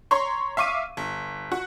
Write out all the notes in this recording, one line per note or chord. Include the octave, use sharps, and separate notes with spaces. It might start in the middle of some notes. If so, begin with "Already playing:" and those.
C#5 A#5 C6 C#6
E5 F5 C#6 D6 D#7
G1
F#4